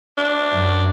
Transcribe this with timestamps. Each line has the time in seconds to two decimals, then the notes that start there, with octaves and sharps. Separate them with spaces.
0.18 D4
0.54 F#2